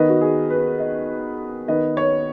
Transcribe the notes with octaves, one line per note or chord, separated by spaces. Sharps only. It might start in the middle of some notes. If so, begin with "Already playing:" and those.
Already playing: D#3 B3 D#5
F#4
G#4
B4
D#5
D#3 B3 D#5
C#5